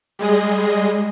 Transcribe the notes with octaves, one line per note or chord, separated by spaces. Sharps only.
G3 G#3 G#4 D#5